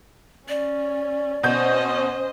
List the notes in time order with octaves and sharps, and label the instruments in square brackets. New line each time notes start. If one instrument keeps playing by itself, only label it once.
[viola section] C#4 [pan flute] D5
[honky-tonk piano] B2 G6 [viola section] C#4 C5 D#5